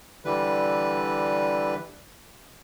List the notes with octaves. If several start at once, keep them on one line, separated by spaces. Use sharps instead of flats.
D3 E3 G3 B4